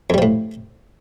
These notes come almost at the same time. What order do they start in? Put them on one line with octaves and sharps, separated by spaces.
F2 G3 F3 A2